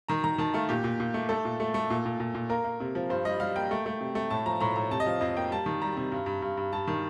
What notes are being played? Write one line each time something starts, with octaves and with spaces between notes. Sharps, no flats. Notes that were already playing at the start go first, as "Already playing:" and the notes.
D#3 A#5
D#3 A#5
D#3 A5
A3 F5
A#2 G4
A#2
A#2
A3
A3 A4
A#2
A3
A3
A#2
A#2
A#2
A#2
A#3 A#4
A#3
C3
F3
G2 C5
G3 D#5
G3 F5
A#3 G5
A3
A3
C3
A3
A2 A5
F3 A#5
A2 A#5
A2 A#5
C3 A5
D#5
F3 F5
F2 D#5
A#3 G5
G3 A5
D#3
G3 A#5
C3
G2
G2
G2
G2
G2 A5
D#3